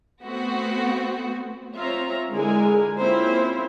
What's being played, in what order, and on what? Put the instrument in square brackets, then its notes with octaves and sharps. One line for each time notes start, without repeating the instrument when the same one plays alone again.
[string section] A3 B3 C4 F#4
[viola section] C4 F4 C#5 E5 A#5
D3 G#3 E4 G#4 A#4 G#5
A#3 C4 C#4 E4 F4 C5